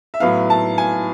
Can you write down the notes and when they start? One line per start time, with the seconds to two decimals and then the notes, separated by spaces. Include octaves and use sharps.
0.14 E5
0.20 A2 F#3 B3 E4 F5
0.50 A5
0.78 G#5